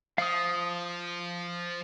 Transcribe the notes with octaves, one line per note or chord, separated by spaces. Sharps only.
F3 F4 F5 D#6